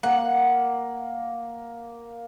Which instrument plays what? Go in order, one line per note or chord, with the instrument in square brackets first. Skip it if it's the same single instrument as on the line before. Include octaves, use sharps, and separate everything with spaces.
[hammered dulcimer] A#3 [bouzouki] F#5